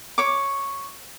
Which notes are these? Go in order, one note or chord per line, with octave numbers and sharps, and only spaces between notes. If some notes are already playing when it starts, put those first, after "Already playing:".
C#5 D6